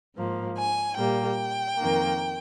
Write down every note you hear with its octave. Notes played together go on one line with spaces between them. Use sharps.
G#2 F3 A#3
G#5
A#2 G3 A#3 G5
F2 D#3 A#3